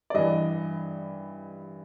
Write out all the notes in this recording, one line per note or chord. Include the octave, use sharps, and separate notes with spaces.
D5
G2 E3 D#5